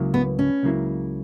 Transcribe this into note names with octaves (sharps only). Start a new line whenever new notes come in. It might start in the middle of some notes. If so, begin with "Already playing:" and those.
Already playing: C#2 C#3 F#3 A#3 E4
B3
C#4
C#2 C#3 F#3 A#3 E4